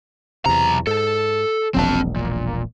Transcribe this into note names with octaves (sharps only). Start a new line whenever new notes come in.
B1 E2 C3 A#5
G#2 A4
E1 A#1 F#3 C4 A5
A#2